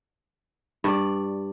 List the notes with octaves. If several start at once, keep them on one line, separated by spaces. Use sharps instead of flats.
G2 D5